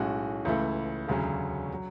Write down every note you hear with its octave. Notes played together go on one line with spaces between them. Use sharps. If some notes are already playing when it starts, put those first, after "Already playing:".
Already playing: B1 A2 G#3 C#4 F#4
C#2 C#3 E3 A3 E4
E1 D2 C#3 F#3 C#4
F#3